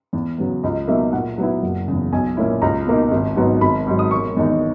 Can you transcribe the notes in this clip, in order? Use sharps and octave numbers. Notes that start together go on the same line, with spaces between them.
E2
C#3 F#3 B3
C#2 D#5
B2 F#3 A#3 D#4 E5
A#2 F#5
F#3 B3 E4
F#1
E2 C#3
B1 G#5
A#2 A#3 C#4 E4
C#2 A#5
B2 A#3 D#4
G#1
G#2 F#3 B3
G#1 B5
G#2 F#3
D#6
E1 C#6
E2 D#3 G#3 D#4